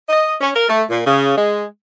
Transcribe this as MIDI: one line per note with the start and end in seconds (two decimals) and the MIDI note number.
0.09 0.33 75
0.41 0.50 61
0.54 0.68 70
0.69 0.83 57
0.89 1.00 46
1.06 1.34 49
1.37 1.64 56